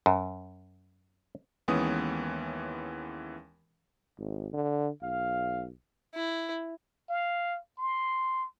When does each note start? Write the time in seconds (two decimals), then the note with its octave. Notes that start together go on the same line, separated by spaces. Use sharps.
0.06 F#2
1.68 D#2 E3 G#3 B3 C#4 D#6
4.18 G#1
4.53 D3
5.02 B1 F5
6.15 E4
7.10 F5
7.78 C6